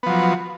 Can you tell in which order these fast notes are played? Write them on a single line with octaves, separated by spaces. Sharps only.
B3 F3 F#3